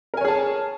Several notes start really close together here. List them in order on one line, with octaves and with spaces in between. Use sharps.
A#4 G#5 C#5 G#4 A5